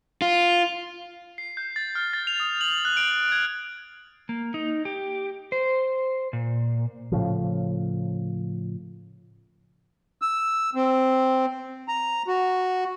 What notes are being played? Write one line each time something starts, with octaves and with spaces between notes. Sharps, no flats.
F4
C7
G6
A6
F6
A6
F7
D#6
F#7
F#6
D7
F#7
G#6
A#3
D#4
G4
C5
A#2
A2 C#3 F3
E6
C4
A#5
F#4